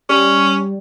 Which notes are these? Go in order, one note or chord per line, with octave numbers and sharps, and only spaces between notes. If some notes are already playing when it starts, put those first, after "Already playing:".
G3 C#4